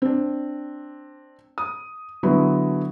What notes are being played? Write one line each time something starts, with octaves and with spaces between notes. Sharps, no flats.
C4 D4
D#6
D3 F#3 B3 D4 E4